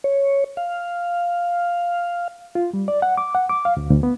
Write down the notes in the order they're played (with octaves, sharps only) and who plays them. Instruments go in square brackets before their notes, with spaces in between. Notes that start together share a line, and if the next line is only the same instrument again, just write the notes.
[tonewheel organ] C#5
F5
[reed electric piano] F4
G3
D5
F#5
D6
F#5
D6
F5
D2
D2
B3